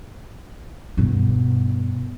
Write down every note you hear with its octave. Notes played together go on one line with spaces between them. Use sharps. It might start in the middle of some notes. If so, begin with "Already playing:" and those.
G2 B2